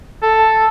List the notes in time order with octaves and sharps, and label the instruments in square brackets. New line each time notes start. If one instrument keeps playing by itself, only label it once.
[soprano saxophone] A4